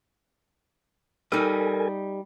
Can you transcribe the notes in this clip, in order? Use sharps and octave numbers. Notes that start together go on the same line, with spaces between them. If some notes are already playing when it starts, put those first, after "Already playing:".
G3 D#4 A4 A#4 G#5